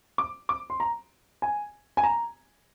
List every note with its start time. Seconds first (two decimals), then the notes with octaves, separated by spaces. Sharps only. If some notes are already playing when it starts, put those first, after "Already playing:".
0.18 D6
0.49 D6
0.70 C6
0.80 A#5
1.42 G#5
1.97 G#5
2.03 A#5